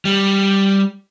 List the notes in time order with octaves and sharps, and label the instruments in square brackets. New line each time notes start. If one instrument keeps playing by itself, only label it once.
[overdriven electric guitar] G3